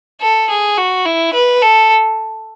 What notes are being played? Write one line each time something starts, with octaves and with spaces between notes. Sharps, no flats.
A4
G#4
F#4
E4
B4
A4